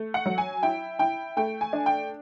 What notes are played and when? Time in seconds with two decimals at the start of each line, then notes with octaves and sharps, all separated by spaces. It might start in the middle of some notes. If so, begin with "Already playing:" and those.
Already playing: A3
0.14 F#5
0.26 F#3
0.38 G#5
0.63 E4 G5
0.99 E4 G5
1.37 A3 G5
1.61 G#5
1.73 D4
1.86 G5